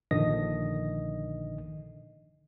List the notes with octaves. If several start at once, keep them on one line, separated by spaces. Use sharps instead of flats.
A#1 D3 D#3 D#5 A#6